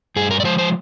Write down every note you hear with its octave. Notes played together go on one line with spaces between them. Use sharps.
G2 G#4
A#4
D5
F3 G#3 C5
C5